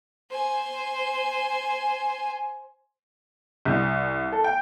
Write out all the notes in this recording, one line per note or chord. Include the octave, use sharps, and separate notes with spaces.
C5 G#5
C2
A4
G5